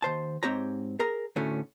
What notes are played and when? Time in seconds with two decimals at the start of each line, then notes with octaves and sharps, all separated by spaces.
0.02 D#2 C5 A5
0.43 G#2 C4 G4 C#5 A#5
0.99 G#4 A#4 A#5
1.36 D2 A2 D3 A3 C#4